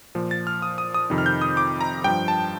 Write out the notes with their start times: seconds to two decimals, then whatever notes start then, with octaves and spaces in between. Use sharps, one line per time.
0.15 A#2 F3
0.31 A6
0.47 F6
0.62 D#6
0.78 D#6
0.94 D#6
1.10 F2 C3 D#3
1.18 F6
1.26 G6
1.41 D#6
1.57 D6
1.81 A#5
2.04 G2 F3 G5
2.28 A5